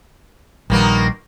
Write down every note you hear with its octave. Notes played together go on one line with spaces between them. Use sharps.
A#1 D#3 G3 A#3 B3